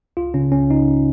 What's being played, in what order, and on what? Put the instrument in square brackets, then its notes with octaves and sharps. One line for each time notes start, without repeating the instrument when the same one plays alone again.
[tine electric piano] C#2 F4
C#3 C#4
C#2 C#4
C#2 D#4